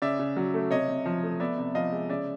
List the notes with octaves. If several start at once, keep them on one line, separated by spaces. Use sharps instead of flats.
C#3 D5 E5
C#3
F#3
A3
C3 C#5 D#5
C3
F3
A3
B3 D5 E5
C3
F3 D#5 F5
G#3
C#3 D5 E5